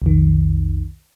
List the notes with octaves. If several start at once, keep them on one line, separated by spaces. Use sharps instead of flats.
B1 F2 D#3